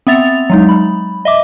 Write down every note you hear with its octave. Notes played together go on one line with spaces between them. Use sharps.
B3 C4 E5 A6 F7
F#3 G#3 D#4
B5
D#5 E5 D6